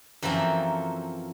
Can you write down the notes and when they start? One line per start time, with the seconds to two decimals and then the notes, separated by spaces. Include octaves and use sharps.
0.22 F#2 E3 F3 A#3 C4 A4